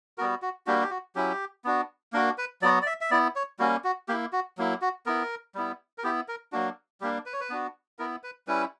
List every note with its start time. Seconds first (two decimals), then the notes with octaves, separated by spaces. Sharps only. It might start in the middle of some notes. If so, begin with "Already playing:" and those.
0.18 G3 B3 F#4 A#4
0.42 F#4
0.67 G3 A#3 D4 F#4 G4
0.81 G4
0.91 F#4
1.15 F#3 C#4 E4 G4
1.64 B3 D4 F#4
2.13 A#3 D4 F#4 A#4
2.38 B4
2.62 F#3 B3 F#4 D5
2.82 D5
2.86 E5
3.01 E5
3.11 B3 E4 D5
3.36 C#5
3.59 G3 A#3 C#4 F#4
3.84 F#4
4.08 A#3 E4 G4
4.33 F#4
4.58 F#3 A#3 E4
4.81 F#4
5.06 B3 E4 A#4
5.55 G3 B3 E4
5.98 A#4
6.04 B3 E4 G4
6.28 A#4
6.52 F#3 A#3 D4 F#4
7.01 G3 A#3 D4 G4
7.26 B4
7.33 C#5
7.40 B4
7.50 B3 D4 F#4
7.99 B3 E4 A#4
8.23 B4
8.47 G3 C#4 E4 B4